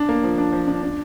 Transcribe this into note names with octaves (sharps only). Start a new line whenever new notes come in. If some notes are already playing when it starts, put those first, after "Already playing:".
Already playing: D4
A#3
F3
D4
F3
D4
D4